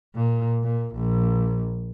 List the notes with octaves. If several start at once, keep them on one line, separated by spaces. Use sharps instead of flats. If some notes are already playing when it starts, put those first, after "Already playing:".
A#2
A#2
A#1